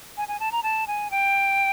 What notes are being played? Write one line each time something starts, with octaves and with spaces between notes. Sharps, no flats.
G#5
G#5
A5
A#5
A5
G#5
G5